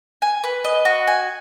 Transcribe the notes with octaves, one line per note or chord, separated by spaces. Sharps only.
G#5
B4
D#5
F#4
G#5